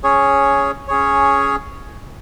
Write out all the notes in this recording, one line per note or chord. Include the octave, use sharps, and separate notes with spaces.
C#4 G#4 C#5
C#4 G#4 C#5